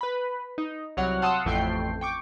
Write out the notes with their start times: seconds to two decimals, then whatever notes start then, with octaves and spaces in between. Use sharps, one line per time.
0.01 B4 B5
0.58 D#4
0.97 C2 F#3 C#5 F#5 F6
1.22 F5 F#5 A5 C6 D#6 E6
1.45 A1 F2 A3 G5 C7
2.01 G5 C#6 D6